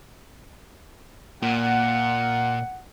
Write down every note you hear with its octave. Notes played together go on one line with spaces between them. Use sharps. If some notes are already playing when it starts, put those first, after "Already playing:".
A#2 F#5